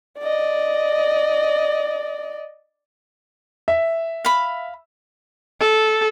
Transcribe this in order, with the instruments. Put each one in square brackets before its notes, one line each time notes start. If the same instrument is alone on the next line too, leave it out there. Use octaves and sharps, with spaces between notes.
[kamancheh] D5 D#5
[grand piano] E5
[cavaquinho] F5 B5
[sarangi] A4